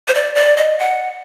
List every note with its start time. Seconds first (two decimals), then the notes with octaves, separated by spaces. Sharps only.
0.08 C5
0.14 D5
0.35 D5
0.57 D#5
0.79 F#5